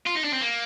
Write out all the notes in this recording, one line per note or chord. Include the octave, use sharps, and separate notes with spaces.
F4
D#4
D4
C4
A#3